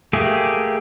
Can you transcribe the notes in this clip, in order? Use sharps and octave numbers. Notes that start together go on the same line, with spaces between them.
A3 A#3 G4 G#4